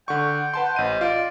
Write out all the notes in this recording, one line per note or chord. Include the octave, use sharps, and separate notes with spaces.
D3 F#5 G5 C#6
B4 A5 C6
A1 C5 D#5 D#7
F4 D5